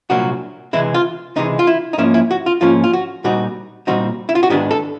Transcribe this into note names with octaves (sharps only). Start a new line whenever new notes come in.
C2 A#2 F#3 A#3 D4 F#4
C#2 C3 E3 G#3 E4
F4
C#2 C3 E3 G#3 D#4
F4
E4
D#4
G#2 F3 A#3 C#4 E4
E4
F#4
F4
G#2 F3 A#3 C#4 F4
F4
F#4
A#2 G3 C4 D#4 F#4
A#2 G3 C4 D#4 F#4
E4
F4
F#4
G#2 D#3 G#3 B3 D4 G4
A4